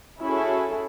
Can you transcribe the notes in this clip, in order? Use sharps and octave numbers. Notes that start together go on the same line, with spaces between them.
C#4 E4 F#4 G#4 A4